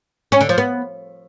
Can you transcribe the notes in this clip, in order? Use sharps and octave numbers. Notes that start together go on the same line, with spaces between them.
C#4
D3
F3
B3